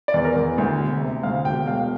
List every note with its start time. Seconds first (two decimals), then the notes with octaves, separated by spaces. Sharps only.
0.08 D5
0.14 E2
0.25 A#4
0.36 E2
0.58 D2
0.79 E1
1.02 C3
1.23 D2 F5
1.45 E1 G5
1.67 E1 F5